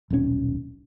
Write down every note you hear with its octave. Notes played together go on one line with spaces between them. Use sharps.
D#1 B1 A#2 C#4